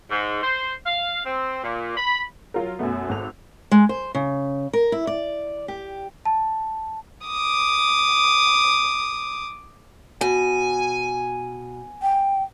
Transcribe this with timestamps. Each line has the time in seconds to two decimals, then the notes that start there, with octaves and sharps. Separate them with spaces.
0.10 G#2
0.43 C5
0.86 F5
1.26 C4
1.64 A#2
1.97 B5
2.54 F#3 F4 A#4
2.79 F#2 B2 A3 B3
3.09 G#1 A4 F7
3.72 G#3
3.89 C5
4.15 C#3
4.73 A#4
4.92 E4
5.07 D5
5.68 G4
6.25 A5
7.27 D6 D#6
10.21 B2 G#5
12.02 G5